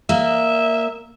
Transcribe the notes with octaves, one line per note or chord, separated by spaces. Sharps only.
A#3 E5